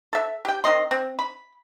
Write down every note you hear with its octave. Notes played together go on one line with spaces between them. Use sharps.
A4 E5
G4 G5
D#3 C4 D#5 C6
C4
B5